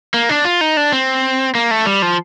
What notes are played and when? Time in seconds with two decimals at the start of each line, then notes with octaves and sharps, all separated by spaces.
0.14 A#3
0.29 D4
0.45 F4
0.61 D#4
0.77 D4
0.92 C4
1.55 A#3
1.71 A3
1.86 G3
2.02 F3